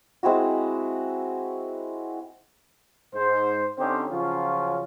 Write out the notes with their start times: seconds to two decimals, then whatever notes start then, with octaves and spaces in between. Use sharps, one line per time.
0.23 G#3 C4 E4 F#4
3.14 G#2 C5
3.78 D3 C4 C#4 D#4 G4 C5
4.11 C#3 F3 F#3 C#4 F4